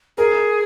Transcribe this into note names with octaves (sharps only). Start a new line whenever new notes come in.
G#4 A#4